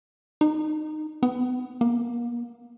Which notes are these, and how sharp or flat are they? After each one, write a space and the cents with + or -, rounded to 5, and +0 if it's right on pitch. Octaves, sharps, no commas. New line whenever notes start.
D#4 -15
B3 +35
A#3 +40